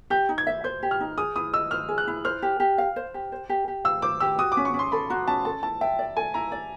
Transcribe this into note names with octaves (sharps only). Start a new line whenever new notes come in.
G4 G6
D#4
G#6
E5
C5 G6
G4
F6
D#4
G#4 D#6
E4 D#6
D#5 E6
C5 F6
G#4
F#6
E4
C5 F6
G4
G4
F5
C5
G4
C5
G4
G4
F5 E6
C5 D6
G4 E6
F#4 D#6
D6
C#4
C#6
C#4
C6
A4 B5
F#4 A#5
C#4 A5
A4 A5
E4 A5
E5 G5
D5
A4 G#5
E4 A#5
D5